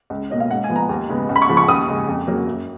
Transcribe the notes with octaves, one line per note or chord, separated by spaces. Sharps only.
C#2
B2 A#3 C#4 D#5
F5
G#2 F#5
G#5
F3 B3
A#5
D#2
C#3 G#3 B3
C#2
B5
C#6
C#3 F3
C#6
D#2 D#6
C#3 G#3
F2
C#3 F#3 A#3
F#2